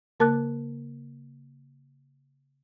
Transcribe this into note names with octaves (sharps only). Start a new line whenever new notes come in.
C#3 A#3 A#4 A5 D6 F#6